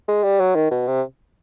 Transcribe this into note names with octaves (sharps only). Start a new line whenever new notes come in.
G#3
G3
F#3
D#3
B2
C3